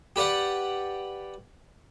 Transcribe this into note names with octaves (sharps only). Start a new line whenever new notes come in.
G4 B4 D5 F#5